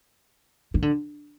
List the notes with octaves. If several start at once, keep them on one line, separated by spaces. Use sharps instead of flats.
D#3
D3